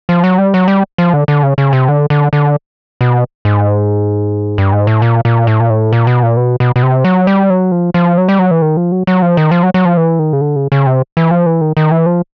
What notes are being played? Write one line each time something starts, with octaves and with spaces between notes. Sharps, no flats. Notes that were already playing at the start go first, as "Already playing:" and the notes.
F3
F#3
G3
F#3
G3
F3
D3
D3
C#3
C#3
C3
D3
D3
D3
B2
G#2
G2
G#2
A2
A#2
A#2
A2
A#2
A2
A#2
B2
A#2
B2
B2
B2
C3
F#3
G3
F#3
F3
F3
F#3
G3
F#3
E3
D#3
F3
F#3
F#3
F3
D#3
F3
F#3
F#3
F3
E3
D#3
C#3
D3
C#3
C#3
C3
E3
F3
E3
D#3
D#3
E3
F3